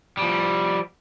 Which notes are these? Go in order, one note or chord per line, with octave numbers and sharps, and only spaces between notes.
F3 G3